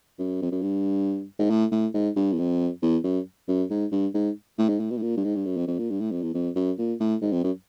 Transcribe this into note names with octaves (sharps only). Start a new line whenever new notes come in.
F#2
F2
F#2
G2
G#2
A2
A2
G#2
G2
E2
F2
E2
F#2
F#2
G#2
G2
G#2
A2
G#2
A2
B2
A2
A#2
G2
G#2
G2
F#2
F2
F2
A#2
G2
A2
F2
E2
F2
F#2
A#2
A2
G#2
F2
F#2